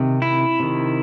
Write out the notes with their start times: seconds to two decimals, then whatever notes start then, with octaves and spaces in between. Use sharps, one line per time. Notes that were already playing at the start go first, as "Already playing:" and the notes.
Already playing: C3 D#3
0.22 E4
0.60 C3 D#3